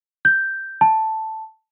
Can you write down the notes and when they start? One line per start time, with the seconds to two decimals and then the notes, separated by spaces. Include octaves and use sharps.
0.25 G6
0.81 A5